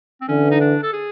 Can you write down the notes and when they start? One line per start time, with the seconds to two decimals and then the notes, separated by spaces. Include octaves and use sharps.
0.21 C4
0.28 D3 E3 C#4
0.51 D#4
0.61 D4
0.83 A4
0.93 G#4